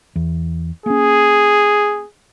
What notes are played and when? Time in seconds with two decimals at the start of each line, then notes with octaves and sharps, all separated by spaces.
0.16 E2
0.86 A#3 C#4 G#4